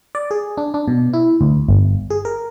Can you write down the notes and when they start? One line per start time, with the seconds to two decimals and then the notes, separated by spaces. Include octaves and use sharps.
0.15 D5
0.31 G#4
0.57 D4
0.74 D4
0.88 B2
1.13 E4
1.41 D2
1.69 G1
2.10 G#4
2.25 A#4